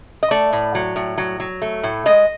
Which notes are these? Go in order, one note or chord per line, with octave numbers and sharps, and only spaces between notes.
D#5
A3 D5
A2
F#3
A2
F#3
F#3
A3
A2
G#3 D#5